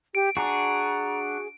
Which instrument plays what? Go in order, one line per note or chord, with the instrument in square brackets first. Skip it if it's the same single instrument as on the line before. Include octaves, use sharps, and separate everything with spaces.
[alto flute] G4 [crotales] D7
[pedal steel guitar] D4 F#4 [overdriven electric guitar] G#4 [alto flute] A#5